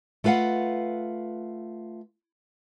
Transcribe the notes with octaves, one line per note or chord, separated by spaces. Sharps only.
A3 F4 B4 F5 F#5